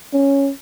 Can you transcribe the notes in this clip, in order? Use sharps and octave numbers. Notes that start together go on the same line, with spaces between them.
C#4